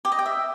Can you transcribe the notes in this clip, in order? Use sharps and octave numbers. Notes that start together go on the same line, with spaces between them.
G4
D#5
G5
E5